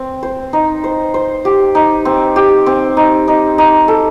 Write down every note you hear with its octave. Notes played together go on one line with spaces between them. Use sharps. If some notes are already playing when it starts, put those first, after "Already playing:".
Already playing: C4
C5
D#4
C5
C5
G4
D#4
C4
G4
C4
D#4
D#4
D#4
A4